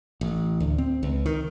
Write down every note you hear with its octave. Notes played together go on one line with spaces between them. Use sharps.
A1
D2
C4
C#2
D#3